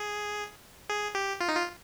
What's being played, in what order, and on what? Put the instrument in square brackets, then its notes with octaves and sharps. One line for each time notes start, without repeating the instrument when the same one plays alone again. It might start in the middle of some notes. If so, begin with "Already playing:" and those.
Already playing: [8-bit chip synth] G#4
G#4
G4
F4
D#4
F4